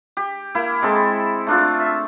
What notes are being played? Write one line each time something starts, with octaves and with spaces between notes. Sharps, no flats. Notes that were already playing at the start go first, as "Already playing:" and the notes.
G4
A#3 E4
G#3 C4 A4
A3 D4 F4
E5